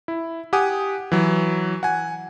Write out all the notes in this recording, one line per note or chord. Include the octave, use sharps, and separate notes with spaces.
E4
G4 F#5 G#5 D#6
E3 F#3
F#5 G#5